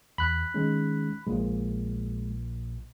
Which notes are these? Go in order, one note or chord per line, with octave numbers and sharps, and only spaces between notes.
E2 B5 F#6
D#3 G#3 C#4
A#1 A#2 G#3